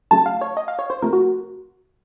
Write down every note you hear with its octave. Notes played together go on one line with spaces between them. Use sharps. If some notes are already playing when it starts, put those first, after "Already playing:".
C#3 F#3 A3 A5
F5
C#5
D#5
F5
C#5
C5
C3 F3 A3 A#4
F#4